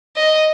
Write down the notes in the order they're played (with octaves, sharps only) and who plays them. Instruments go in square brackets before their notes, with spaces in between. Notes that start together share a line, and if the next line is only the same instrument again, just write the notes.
[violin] D#5